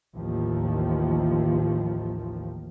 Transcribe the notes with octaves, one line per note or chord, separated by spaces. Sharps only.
A1 D#2 F3